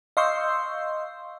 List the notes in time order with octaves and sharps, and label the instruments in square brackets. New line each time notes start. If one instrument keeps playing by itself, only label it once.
[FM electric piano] D#5 F5 C6 C#6 E6 G6